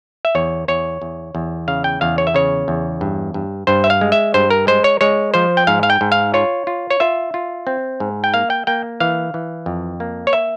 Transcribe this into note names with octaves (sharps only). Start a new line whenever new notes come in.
E5
E2 C#5
E2 C#5
E2
E2
C#3 F5
G5
E2 F5
C#5
E5
C#3 C#5
E2
G2
G2
G2 C5
E5
F5
G#3
E5
G2 C5
A#4
G#3 C5
C#5
G#3 C#5
F3 C5
G5
G#2 F5
F5
G5
G#2
F5
F4 C#5
F4
C#5
F4 E5
F4
C4
G#2
G5
A#3 F5
G5
A#3 G5
E3 F5
E3
F2
A#3
C#5
E5